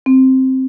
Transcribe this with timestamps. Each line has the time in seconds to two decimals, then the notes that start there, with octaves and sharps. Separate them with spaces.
0.06 C4